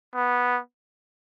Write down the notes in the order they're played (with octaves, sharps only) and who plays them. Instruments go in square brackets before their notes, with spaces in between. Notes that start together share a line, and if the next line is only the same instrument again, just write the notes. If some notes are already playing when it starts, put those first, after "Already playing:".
[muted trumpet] B3